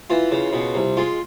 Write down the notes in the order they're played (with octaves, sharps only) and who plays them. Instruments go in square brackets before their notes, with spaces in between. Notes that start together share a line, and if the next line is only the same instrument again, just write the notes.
[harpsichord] E3 F4
C#3
B2
C2
G#3 F4